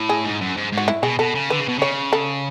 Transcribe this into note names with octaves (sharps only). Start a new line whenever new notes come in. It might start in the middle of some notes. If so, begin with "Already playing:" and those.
Already playing: A2
G#4
G#2
F#2
G#2
G#2
F#4
E4
B2 G#4
B2 A4
C#3
D3 B4
C#3
B2
C#3 C#5
A4